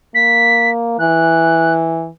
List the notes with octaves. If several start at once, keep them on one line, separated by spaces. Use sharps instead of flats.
A#3 B6
E3 F#6